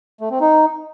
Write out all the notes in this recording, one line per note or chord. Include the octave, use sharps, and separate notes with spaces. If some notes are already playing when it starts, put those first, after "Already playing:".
A3
C4
D#4